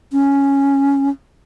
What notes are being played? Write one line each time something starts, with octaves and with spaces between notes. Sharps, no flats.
C#4